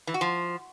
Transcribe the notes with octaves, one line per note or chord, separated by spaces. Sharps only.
E3
F#4
F3